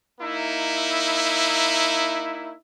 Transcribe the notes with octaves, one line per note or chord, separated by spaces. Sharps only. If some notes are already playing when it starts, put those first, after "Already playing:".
A#3 D#4 E4